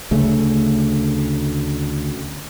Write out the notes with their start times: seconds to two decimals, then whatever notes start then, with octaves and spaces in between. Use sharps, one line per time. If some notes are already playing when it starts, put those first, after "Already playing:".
0.11 D2 C#3 A3